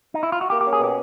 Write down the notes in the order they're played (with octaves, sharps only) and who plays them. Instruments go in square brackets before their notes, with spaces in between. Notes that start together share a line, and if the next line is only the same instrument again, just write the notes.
[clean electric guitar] D#4
E4
F4
F#4
[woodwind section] A#3 [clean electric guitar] G4
[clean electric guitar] G4
[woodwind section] C#4
[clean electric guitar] G#4
[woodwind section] B2 [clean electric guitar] G4